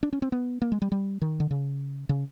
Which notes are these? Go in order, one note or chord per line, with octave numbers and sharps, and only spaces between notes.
D4
C#4
C4
B3
A#3
G#3
G3
G3
D#3
D3
C#3
C#3